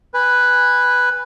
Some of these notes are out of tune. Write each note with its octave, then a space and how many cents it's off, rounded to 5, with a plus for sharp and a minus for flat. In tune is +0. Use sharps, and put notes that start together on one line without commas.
B4 +0 G#5 -20